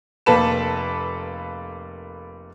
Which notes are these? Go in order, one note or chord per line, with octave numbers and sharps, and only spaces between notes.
F1 A#3 A4 B4 E7